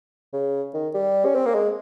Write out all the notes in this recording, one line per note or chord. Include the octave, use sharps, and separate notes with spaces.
C#3
D#3
G3
C#4
C4
A#3
G#3